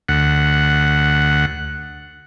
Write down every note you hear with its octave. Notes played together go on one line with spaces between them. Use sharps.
D2 F#5